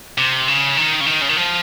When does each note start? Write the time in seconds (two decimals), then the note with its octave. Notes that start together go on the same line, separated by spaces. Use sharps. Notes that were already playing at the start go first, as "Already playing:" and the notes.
0.18 C3
0.48 C#3
0.77 D#3
1.01 C#3
1.06 D#3
1.22 C#3
1.29 D#3
1.37 F3